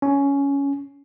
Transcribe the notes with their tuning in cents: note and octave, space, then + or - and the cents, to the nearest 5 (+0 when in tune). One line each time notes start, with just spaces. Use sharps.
C#4 +10